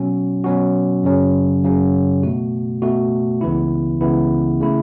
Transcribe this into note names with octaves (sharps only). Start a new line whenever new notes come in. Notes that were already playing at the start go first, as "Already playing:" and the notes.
Already playing: B2 F#3 C#4 F#4
B2 F#3 C#4 F#4
F#2 C#3 F#3 C#4
F#2 C#3 F#3 C#4
B2 A3 F#4
B2 A3 F#4
C#2 C#3 E3 B3 E4
C#2 C#3 E3 B3 E4
C#3 A3 E4